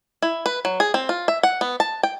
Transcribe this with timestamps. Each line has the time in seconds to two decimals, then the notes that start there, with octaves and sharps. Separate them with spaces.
0.22 E4
0.46 B4
0.65 F#3
0.80 G#4
0.94 C4
1.09 F4
1.28 E5
1.43 F#5
1.61 B3
1.80 A5
2.03 G5